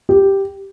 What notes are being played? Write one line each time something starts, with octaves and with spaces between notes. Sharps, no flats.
G4